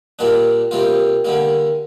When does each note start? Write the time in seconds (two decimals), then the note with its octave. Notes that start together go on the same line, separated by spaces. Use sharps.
0.19 A#2 G3 A#3 D4
0.71 C3 G3 A#3 F4
1.25 D3 G3 A#3